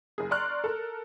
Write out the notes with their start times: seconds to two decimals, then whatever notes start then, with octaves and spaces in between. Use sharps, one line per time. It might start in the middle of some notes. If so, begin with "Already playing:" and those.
0.18 F#1 G#4
0.31 D5 A#5 C6 C#6 F6 F#6
0.64 A4 A#4